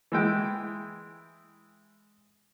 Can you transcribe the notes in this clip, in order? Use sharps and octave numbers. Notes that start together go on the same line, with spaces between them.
E3 G#3 G5